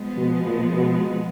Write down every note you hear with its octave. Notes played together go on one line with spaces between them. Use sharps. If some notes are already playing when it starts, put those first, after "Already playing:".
Already playing: F3 G#3 B3
B2
A#2
B2